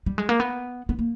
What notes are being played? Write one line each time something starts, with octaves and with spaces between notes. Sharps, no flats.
G3
G#3
A#3
B3
B3
A#3